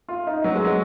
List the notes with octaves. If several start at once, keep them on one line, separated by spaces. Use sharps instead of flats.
F4
D#4
F#3
G#3
F#3